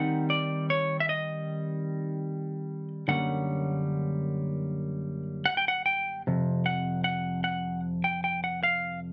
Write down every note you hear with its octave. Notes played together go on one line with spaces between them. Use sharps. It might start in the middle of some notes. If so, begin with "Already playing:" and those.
Already playing: D#3 G3 C4 D#4 F#5
D5
C#5
E5
D#5
F#2 D3 G3 A#3 C#4 F#5
F#5
G5
F#5
G5
F2 C3
F#5
F#5
F#5
G5
G5
F#5
F5